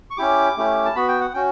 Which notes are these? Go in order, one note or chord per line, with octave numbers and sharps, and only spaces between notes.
C#6
C#4 E4 G4 D6
A3 C#4 E4 G4
A5
B3 F#4 B5
G5
F#5
C#4 F#4 G5